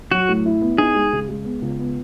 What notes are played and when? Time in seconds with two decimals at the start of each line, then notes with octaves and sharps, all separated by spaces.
0.11 F#3 F#4
0.28 A2
0.46 E4
0.62 B3
0.78 D#4 G#4
0.95 G#3
1.13 C#3
1.29 G#3
1.45 B3
1.62 C#2
1.80 B3